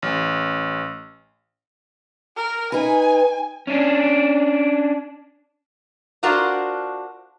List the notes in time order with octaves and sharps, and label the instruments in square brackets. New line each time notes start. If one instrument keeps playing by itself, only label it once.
[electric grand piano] A1
[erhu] A#4
[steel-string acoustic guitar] D#4 B4 [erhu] G#5
[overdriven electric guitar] C#4 D4
[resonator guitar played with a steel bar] D4 F4 F#4 A#4 C5